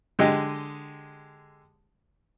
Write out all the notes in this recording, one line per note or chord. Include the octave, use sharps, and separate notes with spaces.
D3 G#3 G4 D#5